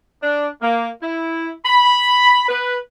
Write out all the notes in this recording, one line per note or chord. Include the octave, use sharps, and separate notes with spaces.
D4
A#3
E4
B5
B4